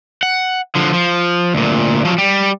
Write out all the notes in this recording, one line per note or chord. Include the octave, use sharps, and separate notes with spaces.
F#5
D3 F3
F3
D2 A#2
F3 F#3
G3